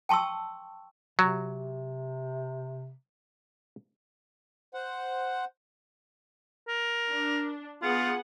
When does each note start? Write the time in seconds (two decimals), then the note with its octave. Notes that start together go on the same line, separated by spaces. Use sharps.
0.09 G5 A5 C6 C#6 E6
1.19 C3 F#3
4.74 C5 F#5
6.68 A#4
7.09 D4
7.82 B3 F4 G#4 F#5